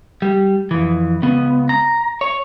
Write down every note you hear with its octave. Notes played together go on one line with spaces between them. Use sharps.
G3
F2 E3
C#2 B3
A#5
C#5